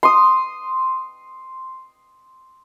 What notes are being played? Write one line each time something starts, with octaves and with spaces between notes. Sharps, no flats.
C6 D#6